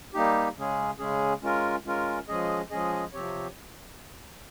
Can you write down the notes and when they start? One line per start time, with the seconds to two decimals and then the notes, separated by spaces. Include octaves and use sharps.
0.14 G3 A#3 D#4 G4
0.57 C#3 G#3 C#4 G#4
0.99 C#3 G#3 C#4 G#4
1.41 G#3 C#4 F4 A#4
1.85 G#3 C#4 F4 A#4
2.28 F3 G#3 C#4 G#4 D#5
2.71 F3 G#3 C#4 G#4 D#5
3.13 C3 F3 C4 G4 C#5